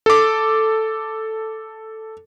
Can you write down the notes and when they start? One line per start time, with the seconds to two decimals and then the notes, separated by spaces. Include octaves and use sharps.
0.06 A4 D6